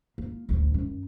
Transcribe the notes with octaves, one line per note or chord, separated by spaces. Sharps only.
A#3 F4
A1 D2
F#2 D#3